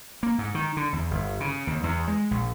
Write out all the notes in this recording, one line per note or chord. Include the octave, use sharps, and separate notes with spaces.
A#3
G#2
D#3
D3
E2
G1
C#3
D#2
E2
G#3
A#1